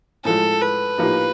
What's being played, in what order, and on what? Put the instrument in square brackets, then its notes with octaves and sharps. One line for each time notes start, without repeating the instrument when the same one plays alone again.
[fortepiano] A2 F3 G#3 [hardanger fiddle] A4
[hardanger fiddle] B4
[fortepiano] A2 F3 A#3 D#4 G4